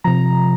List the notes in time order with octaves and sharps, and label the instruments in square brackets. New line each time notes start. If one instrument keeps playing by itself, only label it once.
[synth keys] C3 F3 A#5